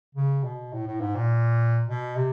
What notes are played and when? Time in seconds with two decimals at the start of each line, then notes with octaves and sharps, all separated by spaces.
0.15 C#3
0.44 B2
0.73 A2
0.87 A2
1.00 G#2
1.16 A#2
1.88 B2
2.16 C3